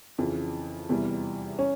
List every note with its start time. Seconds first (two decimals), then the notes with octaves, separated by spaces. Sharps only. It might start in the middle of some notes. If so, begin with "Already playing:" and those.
0.18 F2 C#3 E3
0.89 E2 C3 E3 G3
1.59 C#4